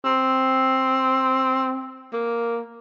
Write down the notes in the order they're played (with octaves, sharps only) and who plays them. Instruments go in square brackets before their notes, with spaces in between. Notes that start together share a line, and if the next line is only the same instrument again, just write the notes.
[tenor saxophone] C4
A#3